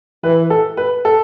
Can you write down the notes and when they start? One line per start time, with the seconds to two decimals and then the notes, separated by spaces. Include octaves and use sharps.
0.23 E3 B4
0.50 A4
0.77 B4
1.05 A4